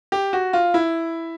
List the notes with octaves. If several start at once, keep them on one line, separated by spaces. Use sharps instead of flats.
G4
F#4
F4
E4